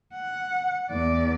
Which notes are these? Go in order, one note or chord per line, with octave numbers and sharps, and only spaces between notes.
F#5
E2 D5